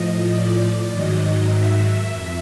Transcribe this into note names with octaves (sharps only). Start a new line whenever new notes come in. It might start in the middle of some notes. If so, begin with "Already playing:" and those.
Already playing: A2 F3 D#5
D5
G#2 D#3 F#3 D#5
E5
F2